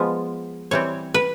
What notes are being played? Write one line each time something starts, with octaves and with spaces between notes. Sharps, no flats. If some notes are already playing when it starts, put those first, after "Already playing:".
Already playing: F3 G#3 B3
E3 G3 C4 C#5
B4